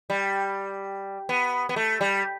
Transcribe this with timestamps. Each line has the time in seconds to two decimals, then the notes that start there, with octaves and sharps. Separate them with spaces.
0.10 G3
1.29 B3
1.69 B3
1.76 A3
2.01 G3